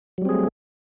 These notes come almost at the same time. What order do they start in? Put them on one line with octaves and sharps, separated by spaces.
F#3 G3 C4 G#4 A3